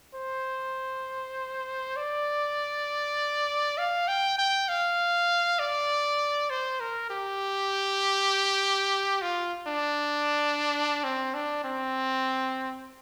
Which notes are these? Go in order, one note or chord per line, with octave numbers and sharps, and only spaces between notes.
C5
D5
F5
G5
G5
F5
D5
C5
A#4
G4
F4
D4
C4
D4
C4